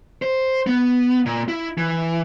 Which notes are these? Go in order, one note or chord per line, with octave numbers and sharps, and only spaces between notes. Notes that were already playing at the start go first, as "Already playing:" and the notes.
C5
B3
A#2
E4
E3